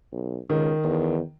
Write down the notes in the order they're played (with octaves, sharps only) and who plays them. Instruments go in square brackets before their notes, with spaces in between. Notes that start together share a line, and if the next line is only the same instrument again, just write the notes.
[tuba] B1
[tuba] C#2 [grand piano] D#3
[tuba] E2